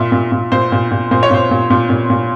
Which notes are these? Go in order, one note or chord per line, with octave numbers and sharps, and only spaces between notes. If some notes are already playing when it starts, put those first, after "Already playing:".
Already playing: A#2 E5
A#2
A#2
A#2 C5
A#2
A#2
A#2 C5
C#5
A#2 C5
A#2
A#2
A#2
A#2